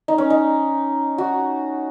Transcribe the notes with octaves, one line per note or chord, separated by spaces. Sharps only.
D#4
C#4
D#4
F#4